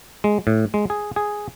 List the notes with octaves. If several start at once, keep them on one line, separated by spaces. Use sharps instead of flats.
G#3
A2
G#3
G#4
G#4